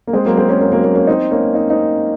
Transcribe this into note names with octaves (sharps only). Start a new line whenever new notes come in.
A#3
G#3 C4
F#3 A#3
G#3 C4
A#3 C#4
A#3 C#4
F#3 A#3
F#3 A#3
A#3 C#4
C4 D#4
A#3 C#4
D#4
C4 D#4